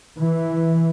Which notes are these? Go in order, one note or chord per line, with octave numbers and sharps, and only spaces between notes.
E3